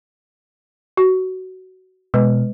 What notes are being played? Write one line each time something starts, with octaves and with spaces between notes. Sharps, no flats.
F#4
B2 G#3 B4